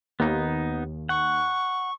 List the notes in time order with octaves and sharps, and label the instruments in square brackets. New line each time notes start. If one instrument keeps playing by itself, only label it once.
[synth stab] D#2 [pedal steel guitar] B3 D#4
[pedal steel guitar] F#5 [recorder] C#6